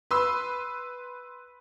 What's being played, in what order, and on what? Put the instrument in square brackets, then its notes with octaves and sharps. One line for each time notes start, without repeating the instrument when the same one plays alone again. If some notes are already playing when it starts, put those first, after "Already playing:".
[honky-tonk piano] B4 C6 E6